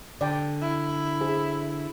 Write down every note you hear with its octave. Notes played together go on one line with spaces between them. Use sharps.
D3 D5 G5
E4
G#4 C5